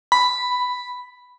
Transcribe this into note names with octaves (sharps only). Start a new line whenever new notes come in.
B5